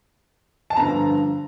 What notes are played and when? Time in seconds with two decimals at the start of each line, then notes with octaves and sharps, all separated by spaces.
0.70 A5
0.76 G2 D3 F3 A#5